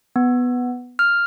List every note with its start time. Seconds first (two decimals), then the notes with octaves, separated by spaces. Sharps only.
0.16 B3
0.99 F6